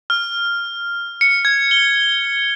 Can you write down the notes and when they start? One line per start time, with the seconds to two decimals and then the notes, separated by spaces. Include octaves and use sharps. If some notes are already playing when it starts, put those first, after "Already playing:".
0.10 F6
1.21 C#7
1.45 G#6
1.71 G7